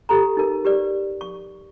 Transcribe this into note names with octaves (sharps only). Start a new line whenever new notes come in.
G4 A4 A#5
D#4 A#4
G4 B4 D5
C#6